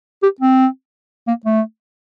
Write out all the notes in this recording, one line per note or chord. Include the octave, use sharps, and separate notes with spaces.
G4
C4
A#3
A3